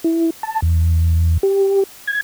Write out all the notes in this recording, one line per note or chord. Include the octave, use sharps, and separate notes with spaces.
E4
A5
E2
G4
G#6